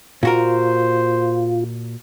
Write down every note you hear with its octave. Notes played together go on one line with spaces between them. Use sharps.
A#2 F4 F#4 A#4 C5